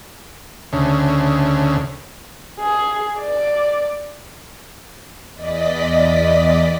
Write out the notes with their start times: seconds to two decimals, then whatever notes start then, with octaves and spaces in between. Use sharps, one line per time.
0.73 D2 C#3
2.59 G#4
3.18 D5
5.34 E2 D5 D#5 B6